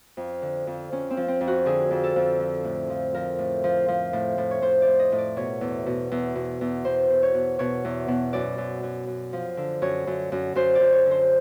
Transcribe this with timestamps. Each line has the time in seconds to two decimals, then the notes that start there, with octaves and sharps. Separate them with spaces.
0.17 F2
0.42 D3
0.67 F2
0.92 F2 C#4
1.10 C4
1.17 F3
1.28 C4
1.41 F2
1.47 F#4
1.66 D3 G#4
1.91 F2
2.04 A4
2.16 F2
2.40 F3
2.64 A2
2.90 F3
3.14 F3 A#4
3.39 A2
3.64 F3
3.88 F3
4.13 A2
4.38 A2
4.51 C#5
4.62 A2 C5
4.82 A2 D5
4.99 D#5
5.12 A2
5.18 D5
5.36 B2 C#5
5.61 E2
5.86 B2
6.11 E2
6.35 B2
6.61 E2
6.85 B2 C5
7.10 B2
7.23 C#5
7.34 B2
7.59 B2 C#5
7.85 E2
8.08 B2
8.33 F#2 D5
8.58 F#2
8.83 F#2
9.07 F#2
9.33 F3
9.57 D3
9.82 F#2 C#5
10.07 F#2
10.32 F#2
10.55 F#2 C5
10.75 F#2 D5
10.92 C#5
11.06 D3
11.11 C5